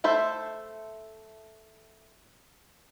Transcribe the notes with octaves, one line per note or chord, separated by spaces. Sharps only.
A3 A4 C5 E5